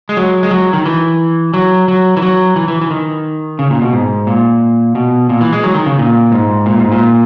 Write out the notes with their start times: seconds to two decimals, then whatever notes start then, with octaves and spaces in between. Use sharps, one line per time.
0.09 G#3
0.17 F#3
0.43 G#3
0.51 F#3
0.73 D#3
0.86 E3
1.54 F#3
1.88 F#3
2.17 E3
2.22 F#3
2.56 E3
2.68 E3
2.81 E3
2.91 D#3
3.59 C#3
3.70 A#2
3.82 B2
3.93 G#2
4.27 A#2
4.95 B2
5.29 A#2
5.41 E3
5.53 G#3
5.64 F#3
5.75 D#3
5.86 C#3
5.99 A#2
6.32 G#2
6.66 A#2
6.79 G#2
6.92 A#2